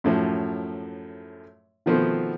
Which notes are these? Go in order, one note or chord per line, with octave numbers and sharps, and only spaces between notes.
F#2 A2 F3
B2 D#3 F3 A3 B3 C4